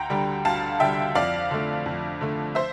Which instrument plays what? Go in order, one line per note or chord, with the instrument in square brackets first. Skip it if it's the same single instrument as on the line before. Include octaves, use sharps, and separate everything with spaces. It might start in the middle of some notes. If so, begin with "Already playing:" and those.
Already playing: [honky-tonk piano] D2 G5 A#5
D3 G3
D2 F5 A5
D3 G3 E5 G5
F2 D5 F5
D3 A3
F2
D3 A3
C5 E5